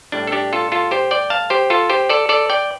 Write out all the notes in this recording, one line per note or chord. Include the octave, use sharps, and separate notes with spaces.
A2 G3 D4
A4
D4 G4
F4 A4
F4 A4
G4 C5
D5 G5
F5 A5
G4 C5
F4 A4
G4 C5
A4 D5
A4 D5
D5 G5